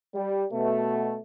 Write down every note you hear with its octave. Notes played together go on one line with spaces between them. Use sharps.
G3
B2 A3